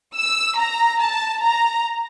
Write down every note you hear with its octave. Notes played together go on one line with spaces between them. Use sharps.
E6
A#5
A5
A#5